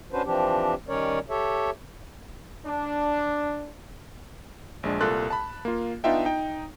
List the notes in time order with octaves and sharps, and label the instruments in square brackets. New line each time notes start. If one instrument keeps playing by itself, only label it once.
[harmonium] C#4 D4 F#4 B4 C5
E3 F3 C4 D4 G4
D#3 G3 C#4 A#4 C#5 D5
G4 A4 C#5 E5
[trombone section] D4
[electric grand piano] A#1 G#3 D4
C2 A#2 A4 C6 F#6
A5 B5
A#3 F4
B3 D4 D#4 F4 E5 G5
D#4 G5